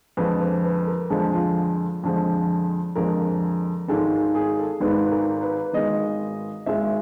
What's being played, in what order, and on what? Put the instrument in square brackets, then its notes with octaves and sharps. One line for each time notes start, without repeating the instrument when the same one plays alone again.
[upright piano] F2 D3 F3 G#3 B4
C5
B4
A#4
F2 D3 F3 G#3 A4
F4
F2 D3 F3 G#3
F2 D3 F3 G#3 A#4
G#1 G#2 D#3 G#3 A4
G#4
A4
G#1 G#2 D#3 G#3 B4
A#4
B4
G#1 G#2 D#3 G#3 D#5
G#1 G#2 D#3 G#3 E5